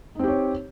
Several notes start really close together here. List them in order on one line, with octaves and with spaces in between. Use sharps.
D#4 C4 G4 C#5